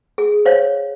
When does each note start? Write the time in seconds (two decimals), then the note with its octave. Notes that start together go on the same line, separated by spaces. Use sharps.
0.18 G#4
0.45 C5 C#5 F5